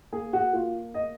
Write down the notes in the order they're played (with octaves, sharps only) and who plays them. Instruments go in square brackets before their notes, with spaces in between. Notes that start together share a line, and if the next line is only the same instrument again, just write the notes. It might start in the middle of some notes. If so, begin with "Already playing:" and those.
[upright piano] A#3 G#4
F#4
A#3 F4
D#5